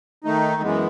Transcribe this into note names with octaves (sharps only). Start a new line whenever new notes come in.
D#3 A3 D#4
F#2 E3 G#3 B3